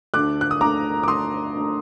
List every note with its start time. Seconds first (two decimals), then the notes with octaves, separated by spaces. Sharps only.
0.14 D2 D3 A3 D6 F#6
0.41 F#6
0.51 D#6
0.61 D2 D3 A3 A#5 D6
1.03 D6
1.08 D2 D3 A3 C6 D#6
1.55 D2 D3 A3